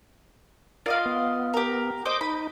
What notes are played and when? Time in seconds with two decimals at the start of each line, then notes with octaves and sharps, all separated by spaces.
0.86 F4 A#4 D5 D#5 F5
1.06 B3
1.54 G4 A#4
2.05 C5 D#5 D6 G6
2.21 D#4 B5